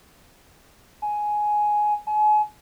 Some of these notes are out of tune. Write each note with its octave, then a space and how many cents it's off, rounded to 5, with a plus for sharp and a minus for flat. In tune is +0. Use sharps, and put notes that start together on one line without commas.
G#5 +10
G#5 +35